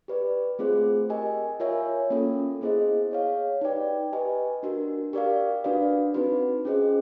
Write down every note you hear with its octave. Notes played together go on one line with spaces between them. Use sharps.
G4 B4 D5
A3 C4 F4 G#4 C5
G4 A#4 D#5 G#5
F4 A#4 C#5 E5 G#5
A#3 C#4 F4 A4
B3 E4 G#4 C5 D#5
G#4 C#5 F5
D#4 G4 B4 D5 G5
G4 B4 D#5 G#5
D4 F#4 A#4
G4 A#4 D5 F5
D4 F#4 B4 D5 F5
C4 D#4 F#4 B4
C#4 F4 G#4 C5 D#5